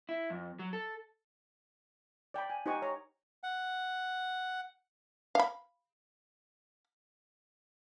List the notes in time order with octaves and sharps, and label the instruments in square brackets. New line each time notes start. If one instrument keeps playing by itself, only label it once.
[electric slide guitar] E4
F2
F#3
A4
[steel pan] D5 G5 A5 B5
G#5
D#4 G4 C5 F#5 G#5 C#6
C#5 A#5
[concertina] F#5
[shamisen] F5 B5